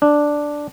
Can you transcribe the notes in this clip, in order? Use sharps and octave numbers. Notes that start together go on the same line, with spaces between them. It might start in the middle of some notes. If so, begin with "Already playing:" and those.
D4